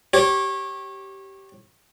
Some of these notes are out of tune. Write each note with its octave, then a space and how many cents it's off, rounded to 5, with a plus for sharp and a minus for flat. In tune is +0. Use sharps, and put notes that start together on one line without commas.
G4 -15 C#5 -25